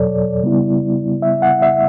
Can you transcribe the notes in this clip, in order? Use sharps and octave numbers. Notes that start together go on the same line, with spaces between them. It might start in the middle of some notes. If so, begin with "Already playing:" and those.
Already playing: E2 B2 F#3 A4 C#5 D5
C#3 G3 B3 E4
E5
F#5
E5